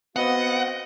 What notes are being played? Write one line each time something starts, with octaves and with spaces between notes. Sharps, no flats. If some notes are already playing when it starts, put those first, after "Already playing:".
B3 C4 F#4 D#5 F5 F#5